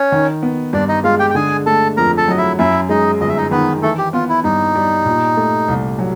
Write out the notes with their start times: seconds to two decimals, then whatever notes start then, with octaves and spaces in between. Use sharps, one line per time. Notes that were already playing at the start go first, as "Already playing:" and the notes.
Already playing: C#4 C#5
0.12 D#3
0.43 B3
0.73 G2 D4 D5
0.88 D#4 D#5
1.04 G#3 F4 F5
1.19 G4 G5
1.30 G5
1.35 D3 G#4 G#5
1.66 A3 A4 A5
1.97 F2 A#4 A#5
2.17 A4 A5
2.28 F#3 D#5
2.38 E4 E5
2.59 F#2 E4 E5
2.89 G#3 D#4 D#5
3.20 G1 D#5
3.29 E5
3.37 D#4 D#5
3.51 D#3 B3 B4
3.82 E3 A3 A4
3.98 G4
4.13 B3 F4
4.29 E4
4.44 G2 D#4
4.76 G3
5.05 A#2
5.37 A3
5.68 C2
5.99 F#3